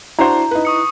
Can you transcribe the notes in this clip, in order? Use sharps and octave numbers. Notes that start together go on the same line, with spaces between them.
D4 E4 F#4 C5 A#5
D#4 B4
C#6 D#6 C#7